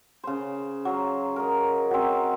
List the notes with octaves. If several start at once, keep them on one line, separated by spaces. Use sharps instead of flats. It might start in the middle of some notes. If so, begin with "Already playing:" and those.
C#3 C5
F#3 F5
A#4 D#5
F#3 C4